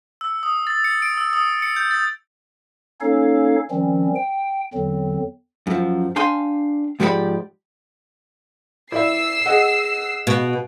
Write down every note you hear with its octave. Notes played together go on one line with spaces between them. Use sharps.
E6
D#6
A6
C#7
D7
E6
D#6
C#7
G6
A6
A#3 C#4 D#4 A4 C#5 F5
D#3 F3 G3 C4 C#4
G5
E2 D3 F#3 C4
F#2 F3
D4 F5 G5 G#5 C6
G#2 F3 G4 B4 D5 B5
E4 D5 E5 E6 C7
G#4 D#5 F#5
B2